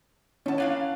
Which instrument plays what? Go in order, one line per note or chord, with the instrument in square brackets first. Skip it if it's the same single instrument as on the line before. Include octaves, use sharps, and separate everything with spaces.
[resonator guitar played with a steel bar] D#3 A5 [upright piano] C#4 E4 F#5
[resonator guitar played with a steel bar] A#3 D4 F5